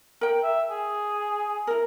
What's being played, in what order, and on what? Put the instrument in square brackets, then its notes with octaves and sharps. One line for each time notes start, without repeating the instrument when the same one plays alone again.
[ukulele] A#4 G5
[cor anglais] E5
G#4
[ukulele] E4 A#4